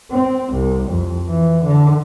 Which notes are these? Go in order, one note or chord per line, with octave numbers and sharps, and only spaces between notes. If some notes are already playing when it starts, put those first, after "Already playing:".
C4
C2
F2
E3
D3